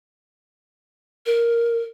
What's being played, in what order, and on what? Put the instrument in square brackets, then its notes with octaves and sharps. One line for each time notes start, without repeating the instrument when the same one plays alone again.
[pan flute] A#4